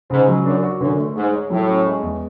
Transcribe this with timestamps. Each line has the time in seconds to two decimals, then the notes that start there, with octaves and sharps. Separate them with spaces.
0.10 G#2 C#3
0.28 F#3
0.45 F#2 D4
0.63 F#4
0.80 F#2 D3
0.98 A3
1.16 G#2 G#4
1.33 C#5
1.50 A2 F#3
1.68 C#4
1.86 G#3
2.03 E2